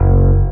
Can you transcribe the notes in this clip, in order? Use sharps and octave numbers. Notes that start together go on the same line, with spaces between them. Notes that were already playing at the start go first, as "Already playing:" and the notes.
Already playing: F#1